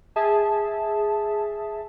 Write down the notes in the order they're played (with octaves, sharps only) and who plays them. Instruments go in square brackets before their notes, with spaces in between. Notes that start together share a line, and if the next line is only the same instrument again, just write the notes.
[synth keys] G#4 E5 A5